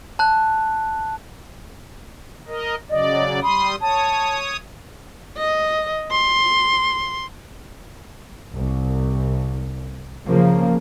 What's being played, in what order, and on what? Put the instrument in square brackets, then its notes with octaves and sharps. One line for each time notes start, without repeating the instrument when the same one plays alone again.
[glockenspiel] A5 F#6
[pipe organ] A#4 D#5
[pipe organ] C#3 F#3 D5 [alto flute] D#5
[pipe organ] G3 C6 D#6 [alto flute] B5
[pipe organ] C#5 D#6 [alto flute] A5
[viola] D#5
C6
[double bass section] C2
C#3 F3 A#3